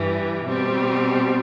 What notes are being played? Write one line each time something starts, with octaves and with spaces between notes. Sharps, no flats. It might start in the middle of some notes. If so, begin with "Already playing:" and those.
Already playing: G2 E3 G3
B2 G3 C4